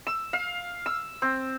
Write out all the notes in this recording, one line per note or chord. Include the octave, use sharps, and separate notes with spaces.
E6
F5
E6
C4